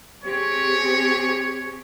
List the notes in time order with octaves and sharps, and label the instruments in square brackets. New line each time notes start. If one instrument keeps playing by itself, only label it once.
[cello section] C4 G4 G#4 [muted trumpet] C#5